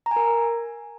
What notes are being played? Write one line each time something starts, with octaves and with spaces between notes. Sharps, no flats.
A#5
G#5
A#4